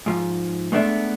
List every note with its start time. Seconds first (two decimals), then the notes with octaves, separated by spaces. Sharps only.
0.06 G#2 F3
0.72 G#3 A3 B3 D4 E5